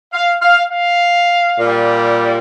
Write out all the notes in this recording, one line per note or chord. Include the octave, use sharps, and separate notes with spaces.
F5
F5
F5
A#2 G3